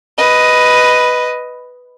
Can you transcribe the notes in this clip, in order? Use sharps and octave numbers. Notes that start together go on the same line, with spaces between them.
B4 D#5